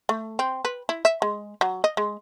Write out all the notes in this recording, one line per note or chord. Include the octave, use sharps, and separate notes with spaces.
A3
C4
B4
E4
E5
G#3
F#3
D#5
G#3